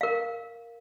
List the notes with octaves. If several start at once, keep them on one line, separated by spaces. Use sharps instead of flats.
A#4 F5